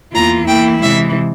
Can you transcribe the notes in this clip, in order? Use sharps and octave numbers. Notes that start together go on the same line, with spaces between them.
E2 E3 A#3 F4 A#5
E3 A#3 E4 G5
C3 E3 G#3 E5